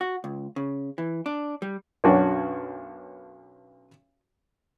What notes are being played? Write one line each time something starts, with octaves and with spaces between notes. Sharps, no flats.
F#4
C#2
C#3
E3
D4
G3
B1 F#2 C#4 D4 F#4